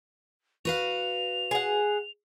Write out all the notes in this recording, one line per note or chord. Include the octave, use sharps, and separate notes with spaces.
F#4 B4 F5 F7
G#4 F#5